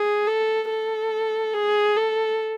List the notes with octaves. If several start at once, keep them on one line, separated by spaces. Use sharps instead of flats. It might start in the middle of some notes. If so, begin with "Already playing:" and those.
Already playing: G#4
A4
A4
G#4
A4